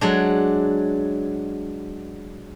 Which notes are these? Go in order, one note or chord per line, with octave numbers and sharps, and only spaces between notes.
F#3 G#3 D4